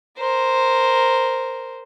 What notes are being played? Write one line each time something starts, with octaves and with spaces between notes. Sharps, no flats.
A#4 C5